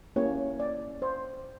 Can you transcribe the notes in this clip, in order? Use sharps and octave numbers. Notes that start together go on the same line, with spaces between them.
A#3 C#4 E4 G4 C#5
D5
C5